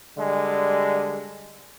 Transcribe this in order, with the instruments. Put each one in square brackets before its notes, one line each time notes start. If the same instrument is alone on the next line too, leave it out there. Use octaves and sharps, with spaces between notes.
[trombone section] D3 G3 G#3